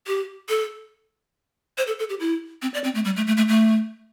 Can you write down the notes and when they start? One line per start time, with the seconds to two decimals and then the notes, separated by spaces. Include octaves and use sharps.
0.07 G4
0.49 A4
1.78 C5
1.87 A4
1.99 A4
2.09 G4
2.20 E4
2.62 C4
2.74 D5
2.84 C4
2.95 A3
3.05 G3
3.16 A3
3.27 A3
3.37 A3
3.48 A3